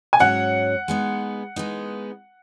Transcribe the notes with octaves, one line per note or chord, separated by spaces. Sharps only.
G#5
G#2 F#3 C#4 F#4 C#5 F#5
G#3 B3 D#4
G#3 B3 D#4